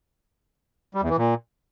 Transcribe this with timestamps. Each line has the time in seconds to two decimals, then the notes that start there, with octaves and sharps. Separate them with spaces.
0.94 G3
1.02 E2
1.10 E3
1.17 A#2